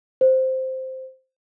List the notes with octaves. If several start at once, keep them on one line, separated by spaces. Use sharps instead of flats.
C5